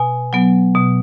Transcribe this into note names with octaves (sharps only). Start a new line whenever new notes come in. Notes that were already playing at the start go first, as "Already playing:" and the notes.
Already playing: B2 G#5
F#3 B3
B2